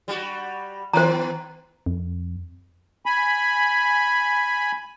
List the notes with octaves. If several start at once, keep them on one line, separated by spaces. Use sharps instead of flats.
G3 F#4
D#3 B3 C5 A#5
F2
G#5 B5